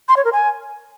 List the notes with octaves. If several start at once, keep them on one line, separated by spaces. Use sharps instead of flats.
C6
C#5
A#4
G#5